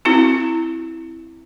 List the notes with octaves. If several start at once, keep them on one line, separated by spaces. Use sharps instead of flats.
C4 E4 F#4